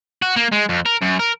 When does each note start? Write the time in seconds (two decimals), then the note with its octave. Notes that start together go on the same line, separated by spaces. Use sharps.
0.22 F#4
0.36 A#3
0.52 G#3
0.69 F2
0.86 A#4
1.02 F#2
1.19 A#4